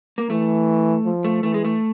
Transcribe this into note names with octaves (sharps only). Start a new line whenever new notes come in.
A#3
E3 A3
F3
A3
E3 A3
G#3
A3